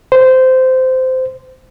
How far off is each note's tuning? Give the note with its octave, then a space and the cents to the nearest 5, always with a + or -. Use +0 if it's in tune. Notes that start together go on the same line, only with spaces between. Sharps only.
C5 -15